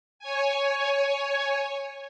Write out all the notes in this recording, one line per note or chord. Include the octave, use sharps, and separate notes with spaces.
C#5 G#5